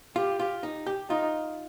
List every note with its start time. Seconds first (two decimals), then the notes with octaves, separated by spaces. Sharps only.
0.16 F4 G4
0.40 F4
0.63 D#4
0.87 G4
1.10 D#4 F4